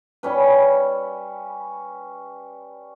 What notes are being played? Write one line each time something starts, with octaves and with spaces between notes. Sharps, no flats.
G3 C#4 B4